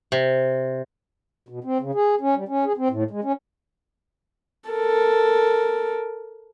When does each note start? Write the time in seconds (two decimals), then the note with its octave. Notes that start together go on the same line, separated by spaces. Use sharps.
0.12 C3
1.49 B2
1.64 C4
1.81 C#3
1.95 G#4
2.21 C#4
2.36 G3
2.49 C#4
2.65 G#4
2.77 C4
2.90 A2
3.11 G#3
3.24 C#4
4.70 A4 A#4